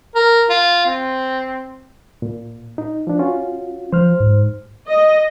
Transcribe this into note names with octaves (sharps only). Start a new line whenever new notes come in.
A#4
F4
C4
A#2
D#4
F3 D4
C#4 F4 F#4
F3 C5 F6
G#2
D#5